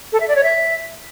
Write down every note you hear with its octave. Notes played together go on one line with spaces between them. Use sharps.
A4
E5
D5
C#5
E5